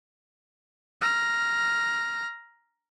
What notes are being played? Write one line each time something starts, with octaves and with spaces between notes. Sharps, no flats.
A#5 F6